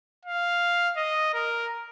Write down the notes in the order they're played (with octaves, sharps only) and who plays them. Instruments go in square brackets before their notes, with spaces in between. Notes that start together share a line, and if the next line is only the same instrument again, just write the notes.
[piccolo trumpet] F5
D#5
A#4